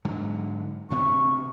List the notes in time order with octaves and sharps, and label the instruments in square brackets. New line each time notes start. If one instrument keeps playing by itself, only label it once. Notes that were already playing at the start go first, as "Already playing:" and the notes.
[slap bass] G#2 D3 F#3
[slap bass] D2 C3 B3 [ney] C#6